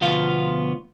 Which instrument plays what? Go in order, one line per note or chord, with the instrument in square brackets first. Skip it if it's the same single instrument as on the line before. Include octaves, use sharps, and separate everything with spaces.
[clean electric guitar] D2 B2 F3 B3 F4 F5